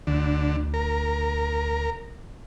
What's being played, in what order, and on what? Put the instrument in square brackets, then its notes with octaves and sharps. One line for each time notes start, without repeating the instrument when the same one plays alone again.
[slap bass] D2 [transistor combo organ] D3
[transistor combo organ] A#4